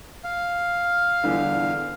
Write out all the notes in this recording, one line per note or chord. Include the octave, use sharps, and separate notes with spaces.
F5
G1 E2 D3